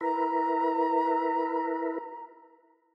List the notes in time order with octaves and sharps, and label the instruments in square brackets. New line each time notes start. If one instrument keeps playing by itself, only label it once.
[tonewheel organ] E4 A#4 B4 [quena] A#5